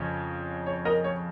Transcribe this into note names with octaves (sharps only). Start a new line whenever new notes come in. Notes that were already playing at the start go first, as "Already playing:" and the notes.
Already playing: F2 C#3 C#4
C#5
A#4 D#5
C#5